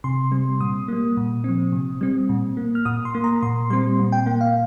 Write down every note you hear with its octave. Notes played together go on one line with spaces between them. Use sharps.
C3 C6
G3 C4
A#2 D#6
G3 A#3
A#2
F3 C4
C3
G3 C4
A#2
A#3
F6
A#2 D#6
C6
A#3
A#5
A#2 C6
G3 C4 C6
A#2
G5
A#3 G5
F5